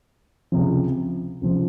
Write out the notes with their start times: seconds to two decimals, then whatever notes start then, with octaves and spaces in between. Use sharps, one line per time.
0.52 C#2 C3 F3
1.41 C#2 C3 F3